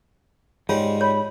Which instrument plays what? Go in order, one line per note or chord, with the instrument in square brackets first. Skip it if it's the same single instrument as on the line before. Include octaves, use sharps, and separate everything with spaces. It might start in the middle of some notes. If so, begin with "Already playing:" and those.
[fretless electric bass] G#2 [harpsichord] G3 G#3 [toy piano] F4 C#5
[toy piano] C#5 [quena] B5